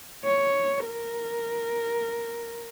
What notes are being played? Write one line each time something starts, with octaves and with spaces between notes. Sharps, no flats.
C#5
A#4